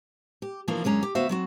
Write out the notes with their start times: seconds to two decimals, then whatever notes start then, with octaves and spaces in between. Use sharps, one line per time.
0.42 G4
0.68 B2 E3 F3 A#3 D4
0.84 F#2 D3 G#3 C#4 A#5
1.03 G4
1.15 D2 B3 F#4 C5 E5 F5
1.29 F#3 C4 F#4